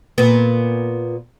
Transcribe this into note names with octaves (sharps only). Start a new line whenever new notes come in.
A#2 B3